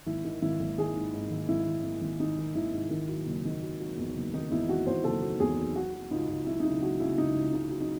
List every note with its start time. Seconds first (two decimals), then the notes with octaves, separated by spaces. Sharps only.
0.06 G#1 E4
0.25 D#3
0.42 G#1 E4
0.60 G#1
0.78 D#3 G#4
0.96 G#2
1.14 G#2
1.31 G#1
1.49 G#1 E4
1.66 D#3
1.84 G#1
2.02 G#1
2.20 D#3 D#4
2.38 D#3
2.55 G#1 E4
2.73 G#2
2.91 D#3
3.09 F#3
3.27 F#1
3.45 D#3
3.62 F#3
3.80 F#3
3.97 E2
4.16 F#1
4.34 D#3 D#4
4.51 E2 E4
4.69 D#3 F#4
4.87 E2 C5
5.04 F#1 A4
5.22 F#3
5.40 E2 G#4
5.58 F#3
5.75 F#3 F#4
5.94 F#3
6.11 C#2 D#4
6.28 C#2
6.46 F#3 E4
6.60 D#4
6.65 C#3 E4
6.82 F#3 F#4
7.00 C#3 E4
7.18 C#3 D#4
7.36 C#2
7.53 C#3 D#4
7.71 F#3
7.80 D#4